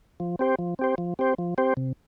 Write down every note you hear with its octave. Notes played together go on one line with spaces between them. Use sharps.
F3
C4 G4 C5
F3
C4 G4 C5
F3
C4 G4 C5
F3
C4 G4 C5
C3